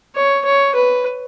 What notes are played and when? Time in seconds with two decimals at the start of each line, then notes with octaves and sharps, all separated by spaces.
0.16 C#5
0.45 C#5
0.75 B4